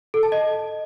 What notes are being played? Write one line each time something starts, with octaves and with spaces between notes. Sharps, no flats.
A4
A5
D#5